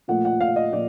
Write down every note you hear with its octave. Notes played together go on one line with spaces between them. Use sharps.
A#2 F3 A3 F#5
F#5
F5
D#5
A#2 F3 D5